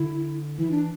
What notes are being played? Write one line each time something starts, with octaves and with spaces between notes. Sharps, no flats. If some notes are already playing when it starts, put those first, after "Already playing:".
Already playing: D3 E4
E3 E4
D4